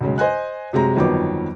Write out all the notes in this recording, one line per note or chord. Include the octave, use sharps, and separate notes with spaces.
B1 C#3 G#3
C5 D#5 G#5 F#6
F#2 C3 G#3 A#5
G1 F2 D#3 F#3 B3 D6